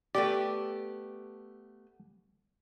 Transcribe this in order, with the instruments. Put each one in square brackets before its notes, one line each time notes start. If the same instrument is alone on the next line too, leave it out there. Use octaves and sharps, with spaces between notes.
[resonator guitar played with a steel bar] A3 B3 G4 [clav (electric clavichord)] D5